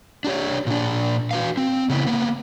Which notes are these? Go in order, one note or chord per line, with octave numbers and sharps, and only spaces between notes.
D4 G4 C#5
A#2 D4
F#4 B4 F5
C4
C#3 B3 E4
A#3 B3